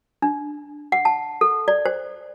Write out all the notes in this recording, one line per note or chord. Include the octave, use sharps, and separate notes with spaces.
D4
F#5
A5
A4
D5
C5